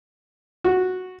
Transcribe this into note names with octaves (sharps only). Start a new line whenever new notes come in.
F#4